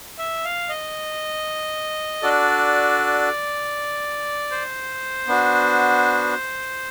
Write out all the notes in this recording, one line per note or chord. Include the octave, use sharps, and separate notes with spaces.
E5
F5
D#5
D4 F#4 A4 D5
C5
B3 D4 F#4